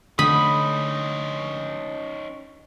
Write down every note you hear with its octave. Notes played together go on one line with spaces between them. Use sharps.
D3 A3 C#4 D#4 B5 D#6